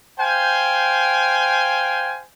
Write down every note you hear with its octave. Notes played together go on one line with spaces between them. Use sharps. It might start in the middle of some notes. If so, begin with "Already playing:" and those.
C5 F5 G5 G#5